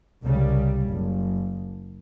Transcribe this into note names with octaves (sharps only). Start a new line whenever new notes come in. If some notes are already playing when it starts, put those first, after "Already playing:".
C2 C#3 G3
F#1